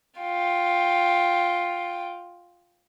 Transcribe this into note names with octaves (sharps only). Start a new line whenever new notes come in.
F4 G5